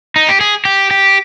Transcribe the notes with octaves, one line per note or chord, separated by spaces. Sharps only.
D#4
G4
G#4
G4
G4